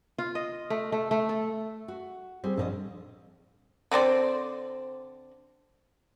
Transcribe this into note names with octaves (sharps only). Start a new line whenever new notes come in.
F4
D#5
A3
A3
A3
A4
F#4
G3 C4 G#4
A#1 A4 A#4 D#5
D3 C4 C5 D5